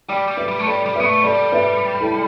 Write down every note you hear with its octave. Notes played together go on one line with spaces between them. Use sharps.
G3 D5 G5
G3
B4 E5
G3
A3
G3 A4 D5
G3
B3 B4 E5
A3
G3 A4 D5
B4 E5
E4 A4